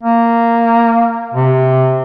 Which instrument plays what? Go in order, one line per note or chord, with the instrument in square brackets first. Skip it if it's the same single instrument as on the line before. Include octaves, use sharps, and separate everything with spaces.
[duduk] A#3
C3